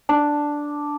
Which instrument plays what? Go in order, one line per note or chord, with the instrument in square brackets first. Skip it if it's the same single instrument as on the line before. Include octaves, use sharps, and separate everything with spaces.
[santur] D4